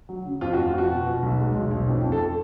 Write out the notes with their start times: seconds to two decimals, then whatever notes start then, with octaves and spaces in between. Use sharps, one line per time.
0.09 F#3
0.25 C#3
0.41 F2 F4
0.53 F#4
0.58 F2
0.66 F4
0.74 F2 F#4
0.90 B2
1.06 B2
1.23 B1
1.39 G#3
1.55 B1
1.71 B1
1.88 F2
2.04 F2
2.12 A4